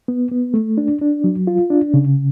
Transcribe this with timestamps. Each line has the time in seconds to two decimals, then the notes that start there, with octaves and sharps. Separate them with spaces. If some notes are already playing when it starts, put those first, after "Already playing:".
0.08 B3
0.31 B3
0.54 A3
0.78 D4
1.01 D4
1.24 F#3
1.47 F4
1.70 D4
1.94 C#3